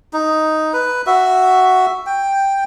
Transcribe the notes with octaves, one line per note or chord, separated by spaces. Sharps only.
D#4
B4
F#4 E5
G5